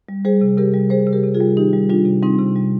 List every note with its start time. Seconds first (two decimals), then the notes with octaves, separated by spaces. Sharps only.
0.09 G3
0.25 G3 G#4 C5
0.41 C3
0.57 C3 G4 A#4
0.74 G3
0.90 G3 G#4 C5
1.07 C3
1.13 G4 A#4
1.24 C3
1.35 F4 G#4
1.40 G3
1.57 D#3 D#4 G4
1.73 G3
1.89 G3 D4 F4
2.06 C3
2.22 G3 C4 D#4
2.39 C3
2.55 G3